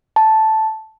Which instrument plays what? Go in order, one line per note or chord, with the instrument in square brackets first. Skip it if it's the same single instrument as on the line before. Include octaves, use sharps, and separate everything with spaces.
[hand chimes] A5